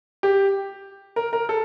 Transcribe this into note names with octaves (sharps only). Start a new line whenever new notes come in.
G4
A#4
A#4
A4